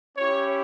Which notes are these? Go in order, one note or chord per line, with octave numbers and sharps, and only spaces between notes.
C#4 E4 G4 C#5